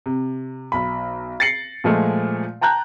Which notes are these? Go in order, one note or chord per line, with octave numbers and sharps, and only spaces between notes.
C3
B1 B5
A6 A#6 C7 C#7 F#7
A#2 F3 G#3 A3
G5 A5 A#5 F#6 G6